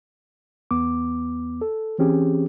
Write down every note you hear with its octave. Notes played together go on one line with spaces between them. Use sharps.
E2 B3 D6
A4
E3 C4 C#4 G4 G#4